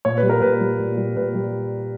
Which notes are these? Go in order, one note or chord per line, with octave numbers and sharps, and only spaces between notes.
A#2 C#5
B4
G3
A#4
A#2 B4
G3
A#2
G3
A#2 B4
G3